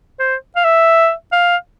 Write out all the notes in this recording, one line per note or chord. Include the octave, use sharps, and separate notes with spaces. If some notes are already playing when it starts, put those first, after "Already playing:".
C5
F5
E5
F5